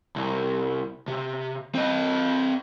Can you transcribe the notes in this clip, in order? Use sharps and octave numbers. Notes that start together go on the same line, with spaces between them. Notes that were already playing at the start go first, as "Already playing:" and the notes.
C2
C3
C4 D#5